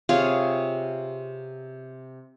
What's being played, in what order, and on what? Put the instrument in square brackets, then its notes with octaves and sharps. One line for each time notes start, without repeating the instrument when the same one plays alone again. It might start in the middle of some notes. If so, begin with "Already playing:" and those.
[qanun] C3 F4 G#4 C#5